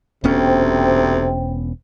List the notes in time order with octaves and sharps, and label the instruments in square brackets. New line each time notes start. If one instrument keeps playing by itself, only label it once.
[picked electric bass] E1 B3 C#4 [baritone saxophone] D2 [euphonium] C3 [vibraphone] C5 G5